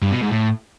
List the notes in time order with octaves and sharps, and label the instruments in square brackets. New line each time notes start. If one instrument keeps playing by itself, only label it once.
[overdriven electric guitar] G2
B2
G#2
A2